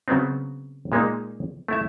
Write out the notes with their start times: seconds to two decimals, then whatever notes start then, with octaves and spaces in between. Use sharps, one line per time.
0.08 C#3 F#3 B3 C4
0.92 A#2 G#3 A#3 D#4
1.68 A3 E4 E5